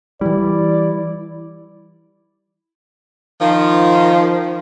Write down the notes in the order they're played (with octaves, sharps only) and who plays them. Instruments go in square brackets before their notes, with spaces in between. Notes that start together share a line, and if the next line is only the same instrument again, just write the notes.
[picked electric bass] E3 G3 [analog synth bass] E4 [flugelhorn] D5
[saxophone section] D#3 F3